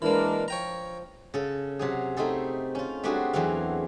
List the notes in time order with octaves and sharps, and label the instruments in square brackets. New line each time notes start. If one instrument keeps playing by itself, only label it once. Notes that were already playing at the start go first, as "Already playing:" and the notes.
[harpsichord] E3 A#3 [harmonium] G#3 D4 A#4
[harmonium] F3 [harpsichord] C#5 G5 A#5
[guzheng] C#3 A4
C3 F#3 G#4
A3 C4 D#4 G#4 A4
C#4 F4
G3 A3 C4 D4 F#4 G#4
E2 E3 F#3 C4 F5